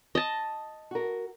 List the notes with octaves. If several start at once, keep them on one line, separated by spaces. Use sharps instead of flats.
D#5 A5
F#4 A#4